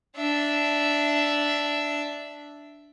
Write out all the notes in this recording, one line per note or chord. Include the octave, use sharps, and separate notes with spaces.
D4 E5